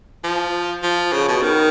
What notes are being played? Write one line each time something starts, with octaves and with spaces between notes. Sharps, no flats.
F3
F3
C#3
B2
D#3